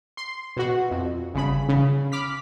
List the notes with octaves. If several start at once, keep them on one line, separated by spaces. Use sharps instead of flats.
C6
B2 F#4
F2
G1 C#3 B5
C#3
B5 D6 F6 B6